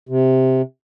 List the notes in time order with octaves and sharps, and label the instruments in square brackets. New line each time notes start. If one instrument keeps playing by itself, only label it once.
[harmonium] C3